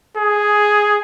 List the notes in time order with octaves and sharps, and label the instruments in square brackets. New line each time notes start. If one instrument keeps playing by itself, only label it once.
[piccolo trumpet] G#4